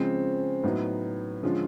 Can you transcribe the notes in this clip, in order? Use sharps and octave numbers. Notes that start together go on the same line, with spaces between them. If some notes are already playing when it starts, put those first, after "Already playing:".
Already playing: C#3 F3 G#3 C4
A2 F#3 B3 D#4
D3 F3 G#3 C#4 F4